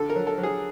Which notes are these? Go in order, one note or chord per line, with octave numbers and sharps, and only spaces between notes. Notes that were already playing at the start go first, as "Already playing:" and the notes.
Already playing: D3 A4
A#4
F#3
A4
F#3
G#4